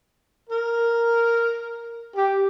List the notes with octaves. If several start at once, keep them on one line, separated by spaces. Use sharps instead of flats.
A#4
G4